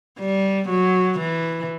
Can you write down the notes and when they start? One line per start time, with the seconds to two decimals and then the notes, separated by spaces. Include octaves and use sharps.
0.19 G3
0.69 F#3
1.19 E3